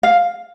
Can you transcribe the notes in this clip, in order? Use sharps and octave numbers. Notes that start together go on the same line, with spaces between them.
F5